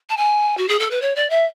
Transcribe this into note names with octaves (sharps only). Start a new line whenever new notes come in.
A5
G#5
F#4
G#4
A4
B4
C#5
D5
E5